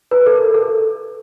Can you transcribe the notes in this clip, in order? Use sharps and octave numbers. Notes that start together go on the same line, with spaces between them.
B4
A4
A#4
A4